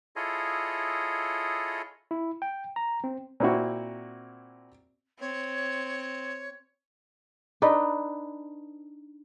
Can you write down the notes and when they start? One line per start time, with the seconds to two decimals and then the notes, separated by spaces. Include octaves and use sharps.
0.16 E4 F4 G#4 A4 C#5 D#5
2.11 E4
2.42 G5
2.76 A#5
3.04 C4
3.40 A#2 C4 E4 F#4
5.20 C4 C#5
7.62 D4 D#4 B4